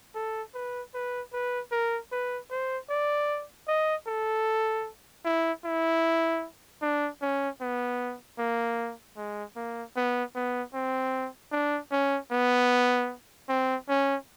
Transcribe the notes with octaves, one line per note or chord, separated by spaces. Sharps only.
A4
B4
B4
B4
A#4
B4
C5
D5
D#5
A4
E4
E4
D4
C#4
B3
A#3
G#3
A#3
B3
B3
C4
D4
C#4
B3
C4
C#4